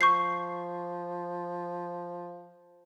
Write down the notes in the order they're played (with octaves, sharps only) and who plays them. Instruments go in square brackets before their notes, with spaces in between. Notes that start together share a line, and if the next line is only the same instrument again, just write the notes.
[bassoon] F3 [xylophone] C#6 G6 C7